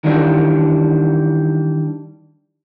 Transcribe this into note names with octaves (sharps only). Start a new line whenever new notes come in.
D#3 E3 G3 D4